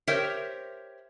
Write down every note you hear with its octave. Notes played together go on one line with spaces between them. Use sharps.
G4 A#4 C5 C#5 E5 G5